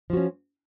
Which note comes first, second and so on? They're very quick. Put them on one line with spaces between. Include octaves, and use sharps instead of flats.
F3 F#4 C#4